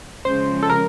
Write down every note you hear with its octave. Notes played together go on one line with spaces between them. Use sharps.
C#3 F3 G#3 C5
A4
A#4